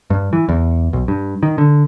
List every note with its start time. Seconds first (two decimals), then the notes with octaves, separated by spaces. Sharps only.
0.10 G2
0.33 E3
0.49 E2
0.93 B1
1.08 G2
1.43 D#3
1.58 D3